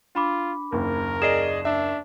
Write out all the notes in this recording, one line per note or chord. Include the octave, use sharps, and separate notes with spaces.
D4 F4 B5 D6
F#1 D#2 A#4
G#4 D5 D#5 C7 E7
D4 E5